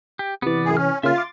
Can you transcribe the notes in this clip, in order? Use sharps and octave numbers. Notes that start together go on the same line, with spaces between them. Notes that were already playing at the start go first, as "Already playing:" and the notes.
G4
C3 E3 B3 D5
F#2 A2 G#4
C#4 F6
C#3 A#3 C#4 F4 E5 F6
C6 D6 A6